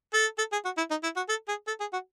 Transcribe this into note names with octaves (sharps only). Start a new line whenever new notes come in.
A4
A4
G#4
F#4
E4
D#4
E4
F#4
A4
G#4
A4
G#4
F#4